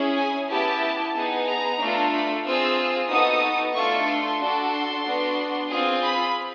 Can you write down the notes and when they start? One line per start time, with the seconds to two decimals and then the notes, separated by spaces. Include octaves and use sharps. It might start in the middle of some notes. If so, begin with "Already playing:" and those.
Already playing: C#4 E4 G#4
0.17 G#5
0.50 B3 E4 G4 A5
1.15 B3 D#4 G#4
1.47 A#5
1.80 A3 D4 F4 A4
2.12 B5
2.45 C4 F4 G#4 E6
3.10 B3 D#4 F#4 A4 D#6
3.75 A3 D4 F4 A4 C#6
4.07 C6
4.40 D4 F#4 A4
4.72 C6
5.05 B3 D4 F#4
5.69 C4 F4 G#4
6.02 B5